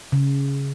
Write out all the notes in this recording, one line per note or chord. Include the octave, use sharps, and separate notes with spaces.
C#3